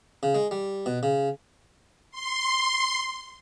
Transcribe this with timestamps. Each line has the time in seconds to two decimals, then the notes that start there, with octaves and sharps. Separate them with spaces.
0.23 C#3
0.35 G#3
0.51 G3
0.86 B2
1.03 C#3
2.11 C6